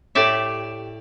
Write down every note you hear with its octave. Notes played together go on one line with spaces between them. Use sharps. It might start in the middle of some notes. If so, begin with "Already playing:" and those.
A2 G4 D5 E5